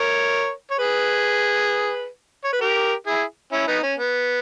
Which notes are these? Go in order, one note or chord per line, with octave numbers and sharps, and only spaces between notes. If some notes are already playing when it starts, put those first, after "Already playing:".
Already playing: A#4 C#5
C#5
G#4 B4
C#5
B4
G4 A#4
E4 G#4
C#4 E4
B3 D#4
C#4
B3